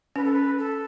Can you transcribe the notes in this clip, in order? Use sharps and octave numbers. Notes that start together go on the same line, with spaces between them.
C#4 B4
A4
B4
A4